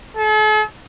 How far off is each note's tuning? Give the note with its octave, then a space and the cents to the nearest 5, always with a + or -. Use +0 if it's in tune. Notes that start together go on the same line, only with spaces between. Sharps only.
A4 -45